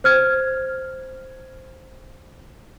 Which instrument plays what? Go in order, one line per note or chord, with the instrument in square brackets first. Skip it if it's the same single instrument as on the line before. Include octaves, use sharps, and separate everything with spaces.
[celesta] C5 F6 G#6